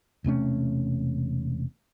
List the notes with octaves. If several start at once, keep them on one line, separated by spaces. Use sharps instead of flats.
E1 C3 A3 C#4